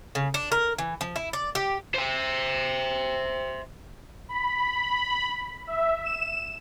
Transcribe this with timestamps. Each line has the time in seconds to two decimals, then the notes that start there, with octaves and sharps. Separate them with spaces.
0.15 C#3
0.34 D4
0.52 A#4
0.78 E3
1.01 F3
1.16 E4
1.33 D5
1.55 G4
1.94 C5 E5
4.29 B5
5.67 E5
6.04 E7